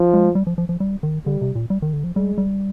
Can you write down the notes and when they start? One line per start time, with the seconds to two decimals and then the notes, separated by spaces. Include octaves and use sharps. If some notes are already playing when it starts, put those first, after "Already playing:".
Already playing: F3
0.14 G#3
0.35 G3
0.47 F3
0.58 F3
0.69 F3
0.80 G3
1.03 D#3
1.25 D3 G3
1.41 C3
1.55 A#2
1.70 G3
1.82 D#3
1.93 D3
2.04 F3
2.16 G3 G#3
2.38 G3